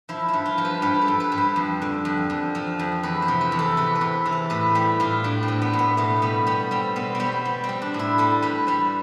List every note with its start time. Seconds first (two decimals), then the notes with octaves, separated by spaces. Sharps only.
0.09 F3 E4
0.28 E4
0.33 G2
0.46 F4
0.58 F3
0.65 B4
0.82 G2 B4
1.02 A4
1.08 G2
1.20 B4
1.32 G2
1.38 C5
1.56 F2
1.82 D3
2.05 F2
2.30 F2
2.55 F3
2.79 F2
3.03 E2 B4
3.22 C5
3.28 C3
3.41 B4
3.52 E2
3.59 A4
3.77 C3 B4
3.95 B4
4.01 C3
4.26 E3
4.32 A4
4.50 A2 B4
4.75 G3 G4
5.00 A2 F4
5.24 A2 D4
5.43 C4
5.48 A2
5.62 B3
5.73 A2
5.79 B3
5.97 B2 A3
6.22 G3 B3
6.47 G3 B3
6.71 G3 C4
6.96 B2 B3
7.15 C4
7.20 G3 B3
7.45 G3
7.64 C4
7.69 G3
7.82 D4
7.94 A2
7.99 E4
8.18 G3 A4
8.42 G3 B4
8.67 G3 C5